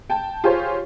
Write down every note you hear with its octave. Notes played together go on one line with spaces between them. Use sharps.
G5 A5
F4 G4 G#4 C5 C#5